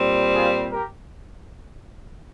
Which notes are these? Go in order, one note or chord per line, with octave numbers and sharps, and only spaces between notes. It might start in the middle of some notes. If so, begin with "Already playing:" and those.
Already playing: A#2 G3 C4
F4 G#4
G4 A#4